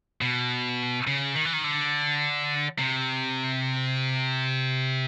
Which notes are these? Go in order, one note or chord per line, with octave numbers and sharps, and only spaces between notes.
B2
C#3
D#3
E3
D#3
D3
C3